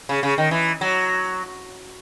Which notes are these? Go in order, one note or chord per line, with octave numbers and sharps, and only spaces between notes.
C#3
C#3
D#3
E3
F#3